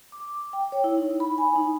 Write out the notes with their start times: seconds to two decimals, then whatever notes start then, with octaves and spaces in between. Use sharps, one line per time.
0.12 D6
0.53 G5
0.72 C#5
0.84 E4
0.98 D#4
1.20 B5
1.38 G#5
1.56 D#4